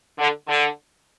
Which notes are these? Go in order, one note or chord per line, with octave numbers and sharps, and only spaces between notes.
D3
D3